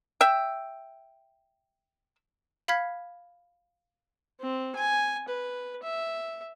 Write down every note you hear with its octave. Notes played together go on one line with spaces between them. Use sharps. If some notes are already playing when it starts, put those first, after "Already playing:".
E5 G5
F5 B5 F6 G#6 B6
C4
G#5
B4
E5